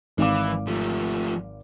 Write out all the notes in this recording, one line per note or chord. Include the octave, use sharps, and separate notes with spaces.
G#1 E3 F5 D6
F3 A3